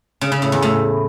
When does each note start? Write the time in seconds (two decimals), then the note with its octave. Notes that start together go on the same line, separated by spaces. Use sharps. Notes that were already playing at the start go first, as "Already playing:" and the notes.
0.21 C#3
0.32 C#3
0.42 A2
0.52 E2
0.62 A2